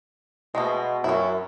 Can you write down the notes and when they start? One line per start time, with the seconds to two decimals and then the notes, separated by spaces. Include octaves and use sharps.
0.55 B2 G#3 A3 B3
1.04 F#2 C#4 E4